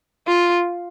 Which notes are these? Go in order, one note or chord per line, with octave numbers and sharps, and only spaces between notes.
F4